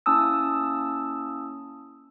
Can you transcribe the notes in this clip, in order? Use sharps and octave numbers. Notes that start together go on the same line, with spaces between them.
A#3 C#4 E4 A5 D#6 E6